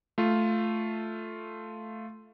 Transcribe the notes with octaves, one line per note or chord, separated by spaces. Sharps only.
A3 F4